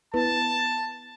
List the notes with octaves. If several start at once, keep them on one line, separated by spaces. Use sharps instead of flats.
B3 E4 B4 A5